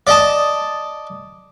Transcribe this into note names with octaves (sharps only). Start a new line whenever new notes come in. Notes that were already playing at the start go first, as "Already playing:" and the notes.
D5 D#5 A5